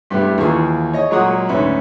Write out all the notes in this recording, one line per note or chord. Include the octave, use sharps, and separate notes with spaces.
G2 G3 A3 B3 E4 G4
D#2 E3 F4 G#4 C#6
C#5 D#5
A#2 F#3 G#3 F#5 C#6 D#6
D2 G#2 C#4 B4 E5 B5